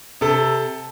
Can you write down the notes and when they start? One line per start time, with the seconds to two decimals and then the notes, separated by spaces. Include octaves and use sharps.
0.21 C3 A4